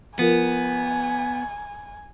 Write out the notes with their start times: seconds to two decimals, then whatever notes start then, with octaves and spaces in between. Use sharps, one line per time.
0.19 F3 B3 F4 A#4 G#5